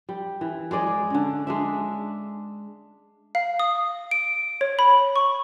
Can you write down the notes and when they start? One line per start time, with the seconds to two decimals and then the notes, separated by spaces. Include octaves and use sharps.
0.09 G3
0.41 E3
0.71 G#3 G#4 D5 D#5
1.10 D3 C#4
1.47 G#3 D4 E5
3.35 F5
3.59 D#6
4.11 D7
4.61 C#5
4.79 B5
5.16 C#6